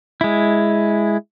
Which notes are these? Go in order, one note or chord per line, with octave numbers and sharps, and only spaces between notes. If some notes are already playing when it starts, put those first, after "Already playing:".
G#3 E4